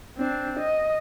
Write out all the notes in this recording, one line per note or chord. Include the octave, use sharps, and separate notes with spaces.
C4 D4
D#5